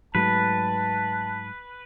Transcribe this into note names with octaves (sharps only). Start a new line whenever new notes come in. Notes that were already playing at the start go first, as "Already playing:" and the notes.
G#2 F#3 A3 B4 A5